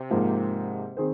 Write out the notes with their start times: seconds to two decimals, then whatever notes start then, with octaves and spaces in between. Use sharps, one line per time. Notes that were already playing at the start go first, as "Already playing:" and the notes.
Already playing: C3
0.10 G#2 F3 A#3
0.97 D#3 C4 G#4 C5